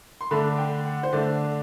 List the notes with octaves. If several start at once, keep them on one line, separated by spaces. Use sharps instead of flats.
C6
D3 A3 D4 B5
G5
F#5
C5
D3 A3 D4 D5